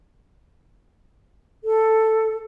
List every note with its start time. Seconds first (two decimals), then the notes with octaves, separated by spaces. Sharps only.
1.64 A4